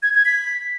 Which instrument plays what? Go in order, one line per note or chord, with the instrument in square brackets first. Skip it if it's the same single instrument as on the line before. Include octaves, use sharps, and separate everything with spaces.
[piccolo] G#6
G#6
B6